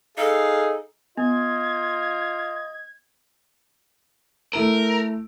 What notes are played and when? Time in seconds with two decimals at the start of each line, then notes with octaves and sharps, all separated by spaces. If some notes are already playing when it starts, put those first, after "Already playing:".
0.18 D#4 G#4 A4 F5
1.17 B3 F4 D#5 G#6
4.53 A3 E4 A#4 D7